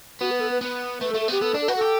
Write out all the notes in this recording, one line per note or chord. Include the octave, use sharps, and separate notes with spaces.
B3 F#4
B4
A4
B4
B3
A3 B4
A4
A3
A4
B3 G4
B3 A4
D4
A4
F#4 B4
G4 A4